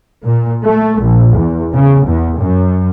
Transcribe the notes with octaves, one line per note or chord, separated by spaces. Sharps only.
A#2
A3
A#1
E2
C#3
E2
F#2